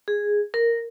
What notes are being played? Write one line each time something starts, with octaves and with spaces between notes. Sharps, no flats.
G#4
A#4